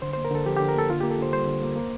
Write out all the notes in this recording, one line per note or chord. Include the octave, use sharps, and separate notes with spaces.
D3 C5
A#3 C5
A#4
D3 A4
F3 G4
D3 G4
A#4
A#3 A4
D3 F4
A#3 G4
A4
D3 C5
G3 C5
D3
A#3
A#3